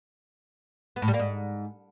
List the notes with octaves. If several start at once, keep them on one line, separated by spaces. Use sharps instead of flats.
B3
A2
G3
A#3
G#2